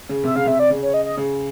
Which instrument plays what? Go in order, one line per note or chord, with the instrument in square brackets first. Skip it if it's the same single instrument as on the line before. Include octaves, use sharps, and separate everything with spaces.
[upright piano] C#3
[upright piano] C3 [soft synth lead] E5
[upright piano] C#3 [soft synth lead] F5
[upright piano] C3 [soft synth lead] E5
[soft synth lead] D5
[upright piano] C#3
[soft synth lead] C#5
D#5
D#5
[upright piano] C#3